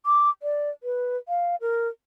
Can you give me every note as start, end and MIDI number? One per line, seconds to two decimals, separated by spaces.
0.06 0.30 86
0.43 0.70 74
0.83 1.17 71
1.28 1.55 77
1.61 1.88 70